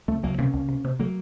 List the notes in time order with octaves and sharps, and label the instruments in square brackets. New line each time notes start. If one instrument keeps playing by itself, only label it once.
[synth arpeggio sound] C#2 [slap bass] A3 C4
[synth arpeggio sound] C#2 [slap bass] F#3 A#3
[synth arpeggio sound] C3 [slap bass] A#3 C#4
[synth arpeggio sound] C#2
C3
C3
[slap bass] F#3 A#3 [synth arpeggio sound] A3